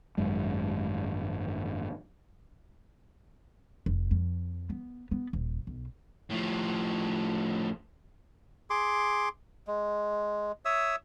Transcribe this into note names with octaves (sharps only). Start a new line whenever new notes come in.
G#1 F#2 G#3
F1
F2
B3
B3
D#1
B1
A2 F3
G#4 C6 D6
G#3
C#5 E5 D#6 E6